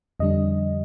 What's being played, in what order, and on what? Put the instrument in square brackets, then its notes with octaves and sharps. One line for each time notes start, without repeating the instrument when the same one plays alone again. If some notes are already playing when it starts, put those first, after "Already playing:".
[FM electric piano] F2 D3 G3 D4 D#5